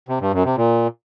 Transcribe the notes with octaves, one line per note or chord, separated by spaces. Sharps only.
C3
G2
F#2
C3
A#2